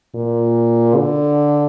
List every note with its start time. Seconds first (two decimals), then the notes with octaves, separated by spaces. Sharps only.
0.15 A#2
0.96 D3